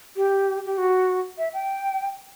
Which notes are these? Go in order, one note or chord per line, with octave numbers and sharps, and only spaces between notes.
G4
G4
F#4
E5
G5